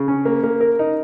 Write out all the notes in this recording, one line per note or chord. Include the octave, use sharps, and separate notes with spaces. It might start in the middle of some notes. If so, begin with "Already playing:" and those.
Already playing: C#3
C#4
A#3
A#3
A#4
D#4